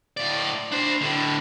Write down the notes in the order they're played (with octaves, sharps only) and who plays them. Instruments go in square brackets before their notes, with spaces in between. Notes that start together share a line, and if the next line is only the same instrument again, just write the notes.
[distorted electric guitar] A2 D5
D4 C5
A2 D3